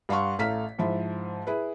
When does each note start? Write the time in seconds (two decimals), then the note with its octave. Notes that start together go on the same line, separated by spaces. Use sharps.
0.09 G2 F5 F#5 C6 C#6
0.39 A1 A3 F5 A#5 F6 B6
0.79 G#2 F3 E4
1.47 E4 G#4 B4